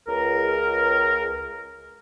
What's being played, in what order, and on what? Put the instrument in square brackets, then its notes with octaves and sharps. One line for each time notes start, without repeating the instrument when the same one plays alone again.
[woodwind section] C#2 A#4